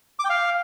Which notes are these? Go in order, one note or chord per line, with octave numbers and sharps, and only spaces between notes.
D6
G5
F5